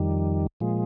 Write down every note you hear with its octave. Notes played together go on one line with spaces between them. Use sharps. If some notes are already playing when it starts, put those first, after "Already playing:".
Already playing: F2 D#3 G3
A#2 F3 G#3